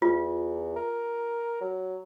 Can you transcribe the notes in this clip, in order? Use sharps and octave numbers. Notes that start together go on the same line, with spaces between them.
E2 F4
A#4
F#3